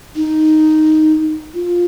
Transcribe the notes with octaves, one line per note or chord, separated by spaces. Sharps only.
D#4
F4